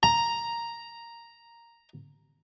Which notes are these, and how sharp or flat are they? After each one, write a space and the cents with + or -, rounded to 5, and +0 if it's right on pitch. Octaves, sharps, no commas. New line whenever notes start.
A#5 +0